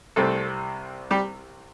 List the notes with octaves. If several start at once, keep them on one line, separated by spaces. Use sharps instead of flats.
C2 C3 G3 A3 C4 A4
G3 G4